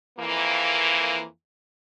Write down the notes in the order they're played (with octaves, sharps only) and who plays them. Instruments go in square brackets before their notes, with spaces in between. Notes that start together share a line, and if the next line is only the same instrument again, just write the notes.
[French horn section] F2 E3 A#3